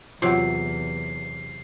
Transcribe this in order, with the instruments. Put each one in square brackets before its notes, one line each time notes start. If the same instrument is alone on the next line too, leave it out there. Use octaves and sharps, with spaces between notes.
[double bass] E2 [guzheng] C3 F#3 [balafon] F4 F#5 [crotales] C7